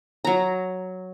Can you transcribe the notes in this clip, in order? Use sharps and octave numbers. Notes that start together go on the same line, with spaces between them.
F#3 A#5